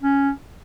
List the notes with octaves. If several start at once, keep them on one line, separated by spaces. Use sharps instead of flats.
C#4